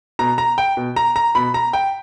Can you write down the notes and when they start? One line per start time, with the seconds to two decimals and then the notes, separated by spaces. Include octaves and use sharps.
0.19 B2 A#5
0.38 A#5
0.58 G5
0.77 B2
0.96 A#5
1.16 A#5
1.35 B2 B5
1.54 A#5
1.73 G5